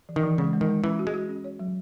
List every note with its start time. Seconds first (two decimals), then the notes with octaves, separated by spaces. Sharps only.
0.09 E3
0.16 D#3
0.23 E3
0.38 C#3 G#3
0.53 G#3
0.61 D#3
0.69 G#3
0.84 E3 C#4
0.99 F#4
1.07 G#3
1.14 F#4
1.29 C#4
1.44 C#5
1.59 F#3